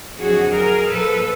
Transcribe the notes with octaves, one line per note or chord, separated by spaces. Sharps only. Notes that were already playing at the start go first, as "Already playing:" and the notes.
F2 D3 F#3 F#4 G#4
G#4 A#4
A#2 F3 A4 B4